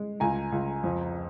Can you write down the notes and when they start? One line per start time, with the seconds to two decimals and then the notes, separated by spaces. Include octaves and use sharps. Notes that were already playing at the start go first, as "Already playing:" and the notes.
Already playing: G#3
0.20 C#2 G#5 A#5
0.52 C#2
0.84 F2